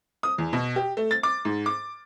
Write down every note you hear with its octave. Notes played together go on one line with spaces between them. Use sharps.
D#6
E2
B2
G4
A3
A6
D6
G#2
D6